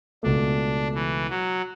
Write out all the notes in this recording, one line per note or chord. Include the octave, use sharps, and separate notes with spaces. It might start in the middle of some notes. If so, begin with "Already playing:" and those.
C#2 B2 A3 D4
E3
F#3